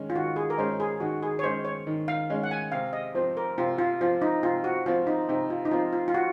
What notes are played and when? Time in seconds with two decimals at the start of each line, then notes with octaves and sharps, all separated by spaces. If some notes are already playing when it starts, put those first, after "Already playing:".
Already playing: D#3 G#3 C#4
0.10 F4
0.15 D#3 F#4
0.36 G#4
0.50 A#4
0.58 G#3 C#4 C5
0.80 G#4
1.00 D#3 F#4
1.23 G#4
1.39 C#5
1.43 G#3 C#4 C5
1.65 C#5
1.87 D#3
2.08 F5
2.30 G#3 C#4
2.43 F#5
2.51 G#5
2.72 C3 F5
2.93 D#5
3.14 F3 C4 C5
3.37 A#4
3.58 C3 F4
3.78 F4
4.01 F3 C4 F4
4.22 D#4
4.43 C3 F4
4.64 F#4
4.86 F3 C4 F4
5.07 D#4
5.29 C3 D#4
5.50 F4
5.65 D#4
5.71 F3 C4 F4
5.93 F4
6.08 F4
6.14 F#4